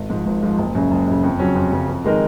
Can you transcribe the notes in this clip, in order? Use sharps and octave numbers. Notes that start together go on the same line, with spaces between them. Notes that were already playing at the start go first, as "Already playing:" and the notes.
Already playing: G#1
G#2 F3
G#1
G#2 F3
F#1
F#2 C#3
F#1
F#2 C#3
F2
C#3 F#3 C#4
F2
C#3 F#3 C#4
F2
D#3 G#3 D#4 A#4